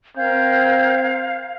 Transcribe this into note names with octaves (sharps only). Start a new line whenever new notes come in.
C4 A#4 F5 G6 G#6